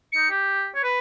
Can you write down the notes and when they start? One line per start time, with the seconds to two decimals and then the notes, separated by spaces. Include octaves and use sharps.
0.12 D#4 C#7
0.30 G4
0.75 C#5
0.83 B4